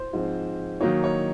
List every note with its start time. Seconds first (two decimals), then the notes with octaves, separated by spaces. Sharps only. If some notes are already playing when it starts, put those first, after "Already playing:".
Already playing: C5
0.13 G#2 F3 C4
0.81 D#3 F#3 A#3 D#4 C#5
1.04 C#5